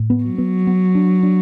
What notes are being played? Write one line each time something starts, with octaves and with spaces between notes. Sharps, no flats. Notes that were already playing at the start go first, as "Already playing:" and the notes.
Already playing: A2
B3
F#3
B3
B3
D4
D4